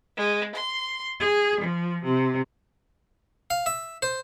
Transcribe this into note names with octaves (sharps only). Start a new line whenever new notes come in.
G#3
C6
G#4
F3
C3
F5
E5
C5